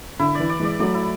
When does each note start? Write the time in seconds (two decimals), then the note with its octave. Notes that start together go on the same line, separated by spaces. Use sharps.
0.19 D3 E4
0.35 E3 D5
0.49 D5
0.60 E3 G#3 D5
0.79 F#3 A3 D5
0.94 E4